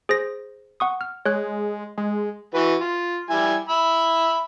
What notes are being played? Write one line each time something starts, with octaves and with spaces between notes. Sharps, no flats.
G#4 C5 A#6
F#5 C#6 D#6
F6
G#3 C#5 F#6
G#3
E3 F#4 B4
F4
G3 E4 G#5
E5 B5 E6